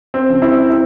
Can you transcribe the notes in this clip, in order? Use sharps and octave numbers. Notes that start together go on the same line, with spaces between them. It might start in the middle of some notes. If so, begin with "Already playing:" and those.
C4
C#3 F3
C4 E4
C4 E4